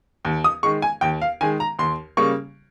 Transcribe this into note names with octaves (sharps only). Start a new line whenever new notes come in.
D#2
D#6
D#3 G#3 C#6
G#5
D#2 G5
F5
D#3 G#3 G#5
A#5
D#2 C6
C#3 G3 A#3 C#6